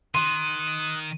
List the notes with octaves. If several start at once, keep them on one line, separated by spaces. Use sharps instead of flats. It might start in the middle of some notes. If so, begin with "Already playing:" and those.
D#3 C6 D#6 F#6 D#7